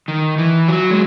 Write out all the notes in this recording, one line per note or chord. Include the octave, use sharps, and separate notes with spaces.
D#3
E3
F#3
G#3